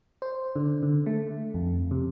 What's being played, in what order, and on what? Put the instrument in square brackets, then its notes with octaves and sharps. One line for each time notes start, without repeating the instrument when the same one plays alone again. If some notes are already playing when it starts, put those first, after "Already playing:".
[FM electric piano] C5
D3
D3
A3
F2
C3